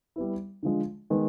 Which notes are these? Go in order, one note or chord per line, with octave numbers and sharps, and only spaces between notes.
G3 B3 E4
D3 F3 G#3
D#3 G#3 B3